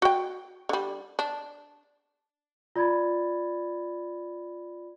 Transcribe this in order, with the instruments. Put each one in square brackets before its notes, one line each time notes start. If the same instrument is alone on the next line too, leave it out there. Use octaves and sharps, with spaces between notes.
[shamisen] F#4 G5
D3 G3
D4
[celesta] F4 D5 B5 G#6 A6